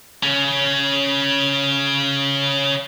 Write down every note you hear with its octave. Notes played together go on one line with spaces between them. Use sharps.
C#3 C#4